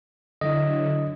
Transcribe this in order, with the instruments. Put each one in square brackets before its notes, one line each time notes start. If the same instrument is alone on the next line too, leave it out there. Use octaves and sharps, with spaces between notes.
[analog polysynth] D3 F#3 E4 [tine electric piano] D#5